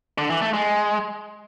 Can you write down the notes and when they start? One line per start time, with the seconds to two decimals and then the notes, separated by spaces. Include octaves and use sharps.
0.18 D3
0.30 E3
0.42 A3
0.53 G#3